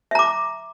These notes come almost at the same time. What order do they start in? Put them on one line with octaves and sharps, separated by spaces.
E5 A#5 D6